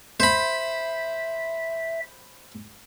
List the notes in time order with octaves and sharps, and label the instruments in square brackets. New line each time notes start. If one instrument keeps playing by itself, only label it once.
[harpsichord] C5 B5 [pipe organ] E5